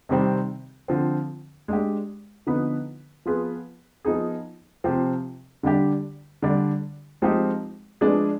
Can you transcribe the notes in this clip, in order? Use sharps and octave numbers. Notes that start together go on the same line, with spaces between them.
C3 D#3 G3 C4
D3 F3 C4
G#3 D4 G4
D3 F3 B3 D#4 B4
F3 B3 F4 G#4 B4
F3 B3 D#4 G#4
C3 F3 C4 G4
D3 G3 D4 G4
D3 G3 D4
F3 G#3 C4 D#4 G4
F3 G#3 D4 G#4 B4